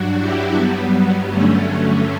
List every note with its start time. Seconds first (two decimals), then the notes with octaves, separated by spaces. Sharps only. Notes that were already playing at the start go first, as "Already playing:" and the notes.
Already playing: G2 F#3 D4 F#4
0.18 E4 G4
0.55 G2 F#3 G3 B3
0.91 G3 B3
1.28 G2 D3 F#3 A3 C#4